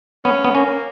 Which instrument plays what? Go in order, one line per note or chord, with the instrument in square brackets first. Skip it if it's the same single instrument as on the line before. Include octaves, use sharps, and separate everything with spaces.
[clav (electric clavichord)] B3 [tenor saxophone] C#4
[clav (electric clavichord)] B3
[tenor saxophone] A#3 [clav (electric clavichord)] C#4